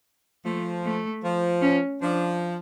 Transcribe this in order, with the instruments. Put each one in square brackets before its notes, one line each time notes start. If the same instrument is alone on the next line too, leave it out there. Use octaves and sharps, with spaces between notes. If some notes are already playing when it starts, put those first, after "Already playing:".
[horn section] F3 [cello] A3
[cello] A3
[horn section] F3
[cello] C#4
[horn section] F3 [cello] D4